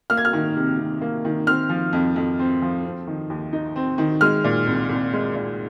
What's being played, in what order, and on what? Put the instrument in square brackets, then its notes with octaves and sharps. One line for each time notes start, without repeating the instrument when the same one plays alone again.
[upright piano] A#3 F6
G#6
F6
D#3
C3
C3
A#3
D#3
C4 F6
F3
F2
F2
C4
F3
C4
D#3
D#2
D#4
C4
D#3
G#3 F6
A#2
C2
C2
G#3
A#2